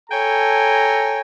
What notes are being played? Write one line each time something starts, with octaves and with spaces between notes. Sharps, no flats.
A4 C#5 G5 G#5 A#5